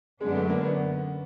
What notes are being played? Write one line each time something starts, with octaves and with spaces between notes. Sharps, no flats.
F#2 D3 F#3 G#3 B3 D4
A3
A#3
B3